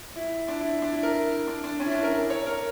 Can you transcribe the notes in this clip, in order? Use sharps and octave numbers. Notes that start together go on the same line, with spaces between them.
E4
D4
E4
D4
E4
A#4
D4
D4
C#4
E4
D4
A#4
A#4
C#5
A#4